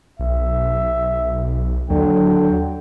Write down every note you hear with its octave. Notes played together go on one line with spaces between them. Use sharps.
B1 E5
D#2 D3 F#3 G5